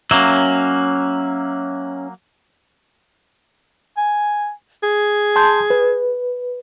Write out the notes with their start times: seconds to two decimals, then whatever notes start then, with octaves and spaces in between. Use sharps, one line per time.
0.11 F#3 A#3 C#4 E5
3.97 G#5
4.83 G#4
5.36 A5 C6 G6
5.70 B4